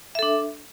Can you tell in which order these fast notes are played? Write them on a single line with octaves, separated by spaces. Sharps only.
E5 A4 D4